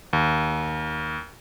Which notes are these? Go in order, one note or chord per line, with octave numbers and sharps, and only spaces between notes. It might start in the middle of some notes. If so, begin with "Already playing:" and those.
D#2